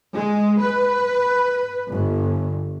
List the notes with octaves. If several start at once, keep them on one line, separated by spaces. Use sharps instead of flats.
G#3
B4
G1